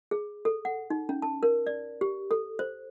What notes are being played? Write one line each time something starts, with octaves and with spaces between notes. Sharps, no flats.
G#4
A4
F#5
D#4
C#4
A5
A#4
D5
G4
A4
C5